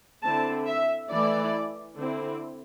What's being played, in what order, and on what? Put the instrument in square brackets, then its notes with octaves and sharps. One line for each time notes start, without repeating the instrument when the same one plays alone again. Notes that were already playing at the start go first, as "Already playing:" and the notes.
[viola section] D3 C4 E4 A5
E5
E3 A3 E4 D5
D3 C4 E4